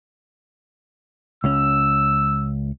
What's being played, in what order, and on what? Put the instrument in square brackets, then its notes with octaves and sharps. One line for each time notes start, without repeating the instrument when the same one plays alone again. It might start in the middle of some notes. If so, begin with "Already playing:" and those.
[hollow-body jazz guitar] C#2 C#4 [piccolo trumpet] E6